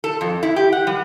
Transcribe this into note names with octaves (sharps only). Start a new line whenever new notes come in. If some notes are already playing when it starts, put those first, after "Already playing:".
A4
F2
E4
G4
F#5
G3